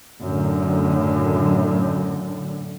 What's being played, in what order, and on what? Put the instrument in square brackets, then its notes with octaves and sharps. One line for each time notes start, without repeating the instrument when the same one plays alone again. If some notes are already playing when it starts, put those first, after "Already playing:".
[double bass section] F#2 A2 D3